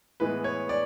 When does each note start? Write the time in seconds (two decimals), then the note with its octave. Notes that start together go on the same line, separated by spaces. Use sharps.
0.20 A2 E3 G#3 B3 B4
0.44 C#5
0.69 D5